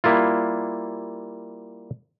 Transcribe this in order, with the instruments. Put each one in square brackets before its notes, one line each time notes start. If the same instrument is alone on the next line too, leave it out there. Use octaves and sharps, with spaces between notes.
[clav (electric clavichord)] G3 A#3 E4 F4